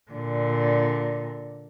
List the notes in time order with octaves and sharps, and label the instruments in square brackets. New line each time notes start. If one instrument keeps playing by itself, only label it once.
[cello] A#2 D3